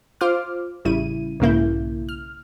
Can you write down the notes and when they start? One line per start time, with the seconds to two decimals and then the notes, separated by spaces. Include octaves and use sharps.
0.21 F4 C5 D6 F6
0.85 A1 C#3 G3 E4 D#7
1.40 B1 G#2 C#3 A#3 E4 G6
2.09 F6